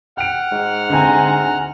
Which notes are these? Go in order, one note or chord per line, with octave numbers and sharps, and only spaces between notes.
F#5 G5 F6 D7
G#2
D2 C4 G#5 A#5